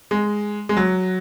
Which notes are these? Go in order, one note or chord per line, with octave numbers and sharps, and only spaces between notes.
G#3
G#3
F#3